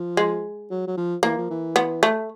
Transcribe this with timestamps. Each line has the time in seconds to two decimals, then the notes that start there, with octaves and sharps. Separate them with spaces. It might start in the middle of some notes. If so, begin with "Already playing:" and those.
Already playing: F3
0.17 G#3
0.71 F#3
0.87 F#3
0.97 F3
1.23 E3 A#3
1.38 F3
1.50 E3
1.76 B3
2.03 A3